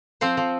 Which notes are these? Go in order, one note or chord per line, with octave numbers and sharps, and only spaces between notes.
F3 C4 C5
F3